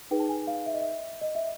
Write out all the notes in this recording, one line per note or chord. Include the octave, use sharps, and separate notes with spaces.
D#4 G#4 B4 G5
A5
G#5
F5
E5
D#5
E5
D#5
E5